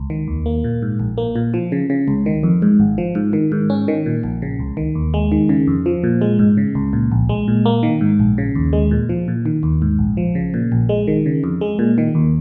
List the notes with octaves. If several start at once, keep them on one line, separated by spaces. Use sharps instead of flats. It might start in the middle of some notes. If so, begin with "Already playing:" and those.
Already playing: C#2
D#3
D#2
A#3
A#2
G#2
A#1
A#3
A#2
F3
C#3
C#3
C#2
D#3
F2
G#2
G#1
F3
G#2
D#3
G#2
C#4
D#3
A#2
A#1
C#3
C#2
D#3
D#2
G#3
D#3
C#3
F2
F3
A#2
G#3
G#2
C#3
C#2
A#2
A#1
G#3
A#2
A#3
D#3
G#2
A#1
C#3
D#2
G#3
A#2
F3
A#2
D#3
D#2
G#2
A#1
F3
C#3
A#2
A#1
G#3
D#3
C#3
F2
G#3
A#2
D#3
D#2